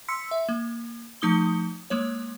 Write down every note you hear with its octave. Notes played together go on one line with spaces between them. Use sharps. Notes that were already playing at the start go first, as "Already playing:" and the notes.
C6 E6 B6 C#7
E5
A#3
F3 A3 D#4 D#6 G7
G#3 A#3 C#5